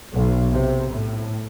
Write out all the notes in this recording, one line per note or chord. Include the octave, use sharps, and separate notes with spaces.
B1
C3
A2